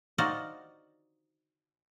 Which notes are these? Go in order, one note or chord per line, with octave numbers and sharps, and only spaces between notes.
D#4 F4 F#4 C5 D5 F5